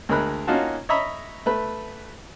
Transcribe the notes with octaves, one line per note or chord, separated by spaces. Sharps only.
D2 G#3 A#4 B5 F#6
A#3 C#4 D#4 F4 F#4 A5
C#5 D#5 E5 A#5 B5
A3 B4